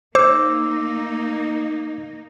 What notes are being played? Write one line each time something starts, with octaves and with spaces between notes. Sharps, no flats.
A#3 D#4 C5 D6 E6